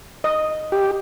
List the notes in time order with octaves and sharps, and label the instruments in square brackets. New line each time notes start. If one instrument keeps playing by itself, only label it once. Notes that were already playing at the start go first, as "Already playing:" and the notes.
[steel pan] D#5
[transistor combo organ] G4